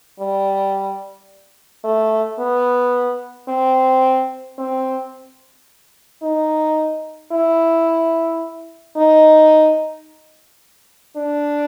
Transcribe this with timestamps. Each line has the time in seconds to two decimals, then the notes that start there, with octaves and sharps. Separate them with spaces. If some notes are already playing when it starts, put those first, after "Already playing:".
0.20 G3
1.84 A3
2.39 B3
3.48 C4
4.58 C4
6.23 D#4
7.32 E4
8.97 D#4
11.16 D4